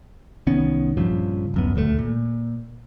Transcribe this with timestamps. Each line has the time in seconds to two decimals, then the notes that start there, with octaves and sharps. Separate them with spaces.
0.47 C2 D#3 B3 C#4
0.97 A#1 G2 C#3 F3
1.54 D1 F#2 B3
1.74 D#1 D2 C3 A3
1.99 A#2